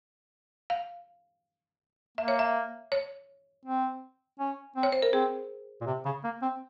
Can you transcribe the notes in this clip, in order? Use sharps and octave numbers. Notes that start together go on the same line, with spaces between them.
F5
A#3 E5
C#5
E5
C#5
C4
C#4
C4
C#5
C5
A#4
C4 G#4
A#2
C3
C#3
A#3
C4